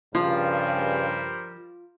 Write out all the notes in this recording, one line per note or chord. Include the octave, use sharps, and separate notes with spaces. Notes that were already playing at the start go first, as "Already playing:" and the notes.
G2 C#3 F3 G3 F4 A#4 C5